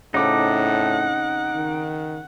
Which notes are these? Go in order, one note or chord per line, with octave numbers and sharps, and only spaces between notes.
A2 C#3 C4 D#4 A4 F#5 D6
D#3